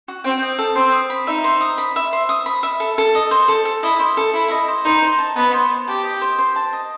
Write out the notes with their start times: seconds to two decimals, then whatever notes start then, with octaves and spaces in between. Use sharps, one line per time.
0.08 F#4
0.24 C4 G5
0.42 D#5
0.59 A4
0.75 C4 C5
0.92 D#6
1.10 B5
1.27 D#4 E5
1.44 C5
1.61 D#6
1.78 B5
1.96 E5
2.13 C5
2.29 D#6
2.46 B5
2.63 E5
2.80 A4
2.98 A4
3.15 D#5
3.31 C5
3.48 A4
3.65 A4
3.83 E4 D#5
3.99 C5
4.17 A4
4.34 E4 A4
4.51 D#5
4.68 C5
4.85 D#4 C5
5.02 C5
5.19 A5
5.36 B3 D#5
5.54 C5
5.70 C5
5.88 G4 A5
6.05 D#5
6.21 C5
6.39 C5
6.56 A5
6.73 D#5